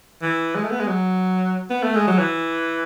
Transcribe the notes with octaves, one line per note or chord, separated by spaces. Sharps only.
E3
G#3
A3
B3
G#3
F#3
B3
A3
G#3
F#3
E3